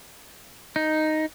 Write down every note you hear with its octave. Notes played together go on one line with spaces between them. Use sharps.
D#4